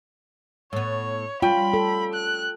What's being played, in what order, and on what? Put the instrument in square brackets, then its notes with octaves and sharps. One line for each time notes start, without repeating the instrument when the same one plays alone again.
[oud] A2 B3 [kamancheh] C#5
[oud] G3 C#4 [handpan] F4 [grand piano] G5 [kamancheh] B5
[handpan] A4
[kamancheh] F#6